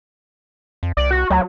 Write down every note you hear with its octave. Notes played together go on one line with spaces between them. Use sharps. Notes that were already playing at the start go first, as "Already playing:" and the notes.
F2
C2 D5
F#4
D2 F#3